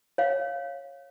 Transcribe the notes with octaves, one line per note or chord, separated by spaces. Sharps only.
C#5 F5